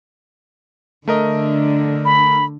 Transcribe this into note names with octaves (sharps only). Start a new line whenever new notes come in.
D3 A3 A#4 D#5
B5